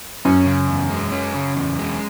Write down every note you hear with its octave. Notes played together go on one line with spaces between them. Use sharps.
F#2 C#4
C#3
E2
G#3
C#4
C#3
E2
G#3